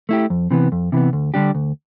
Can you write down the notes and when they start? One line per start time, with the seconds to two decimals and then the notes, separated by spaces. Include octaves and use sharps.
0.09 A3 E4 G4
0.30 F2
0.51 C3 E3 B3
0.72 F2
0.92 C3 E3 B3
1.13 D2
1.34 D3 G3 D4 G4
1.55 D2